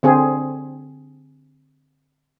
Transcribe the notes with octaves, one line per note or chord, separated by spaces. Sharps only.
D3 C4 G#4